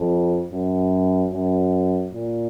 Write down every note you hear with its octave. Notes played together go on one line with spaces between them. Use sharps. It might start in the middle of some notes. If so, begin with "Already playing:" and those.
Already playing: F2
F#2
F#2
A#2